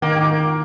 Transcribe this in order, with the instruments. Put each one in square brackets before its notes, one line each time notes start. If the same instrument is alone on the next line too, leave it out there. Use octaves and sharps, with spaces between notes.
[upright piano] D#3 [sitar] A#3
[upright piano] D#3